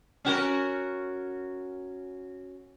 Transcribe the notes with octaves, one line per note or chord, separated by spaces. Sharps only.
C#4 F#4 A#4